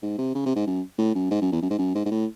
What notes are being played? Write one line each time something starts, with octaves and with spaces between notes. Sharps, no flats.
G#2
C3
C#3
C3
G#2
F#2
A2
F#2
G#2
F#2
E2
F#2
G#2
F#2
G#2
G#2
A2